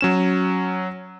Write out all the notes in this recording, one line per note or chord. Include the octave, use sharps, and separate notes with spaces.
F#3 C#4 E7